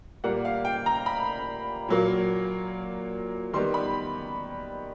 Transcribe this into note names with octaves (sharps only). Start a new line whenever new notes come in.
A#2 G3 A#3 F#5
F5
G5
A#5
B5
A#2 F#3 A#3
D#3 G3 B3 C6
B5